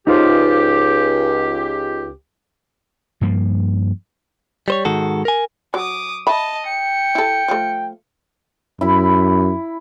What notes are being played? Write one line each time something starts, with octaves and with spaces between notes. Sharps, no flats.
C#2 D#4 F4 G4 C5
G2 F3 A#3
G3 C5 C#5
G#2 D#3 G#3 F#4 A4
A#4 G#5
F#3 D6 D#6
D#5 E5 A5 B5
G5 C#7
E4 A4
F3 A3
F#2 E4 B5